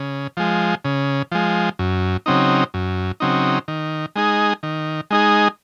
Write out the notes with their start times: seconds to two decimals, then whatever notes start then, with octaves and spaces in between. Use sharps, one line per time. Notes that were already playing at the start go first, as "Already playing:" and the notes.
Already playing: C#3
0.37 F3 G#3
0.85 C#3
1.32 F3 G#3
1.79 F#2
2.26 C#3 F#3 C4 D#4
2.74 F#2
3.20 C#3 F#3 C4 D#4
3.68 D#3
4.16 G#3 D#4 G#4
4.63 D#3
5.11 G#3 D#4 G#4